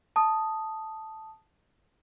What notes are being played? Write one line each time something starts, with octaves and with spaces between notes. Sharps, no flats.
A5 D#6